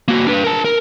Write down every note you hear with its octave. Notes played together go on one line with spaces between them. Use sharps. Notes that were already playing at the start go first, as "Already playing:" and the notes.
A#3 F#4
D4 B4
A#4 A5
A#4